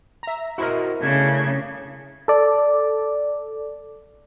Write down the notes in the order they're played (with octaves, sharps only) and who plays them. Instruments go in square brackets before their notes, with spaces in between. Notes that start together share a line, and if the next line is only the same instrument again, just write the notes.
[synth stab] E5 A#5
[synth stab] E4 A#4 [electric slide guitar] F#4 C5 D#5
[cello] C#3 [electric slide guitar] A3 C#4 D4 [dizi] G#6
[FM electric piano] A4 D5